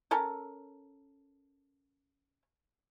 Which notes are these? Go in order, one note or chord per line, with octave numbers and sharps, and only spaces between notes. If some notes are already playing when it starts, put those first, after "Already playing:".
C#4 A4 A#4